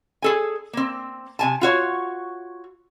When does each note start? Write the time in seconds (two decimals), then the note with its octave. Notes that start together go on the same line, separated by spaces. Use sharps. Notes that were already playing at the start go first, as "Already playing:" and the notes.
0.22 G#4 A4 G#5
0.73 A#3 C4
1.39 C3 G#5 A5
1.61 F4 F#4 C#5